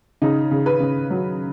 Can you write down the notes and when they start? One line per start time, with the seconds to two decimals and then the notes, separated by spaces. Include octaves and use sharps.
0.22 C#3 D#4
0.51 C#3
0.66 B4
0.80 C#3
1.10 F#3